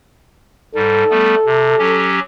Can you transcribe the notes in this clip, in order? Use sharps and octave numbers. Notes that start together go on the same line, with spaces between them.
G#2 G3 A4
G3 A3 B3
C3
F#3 C#4 G4